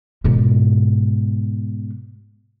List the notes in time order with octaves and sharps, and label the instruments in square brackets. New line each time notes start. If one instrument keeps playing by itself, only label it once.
[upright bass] G#2 B2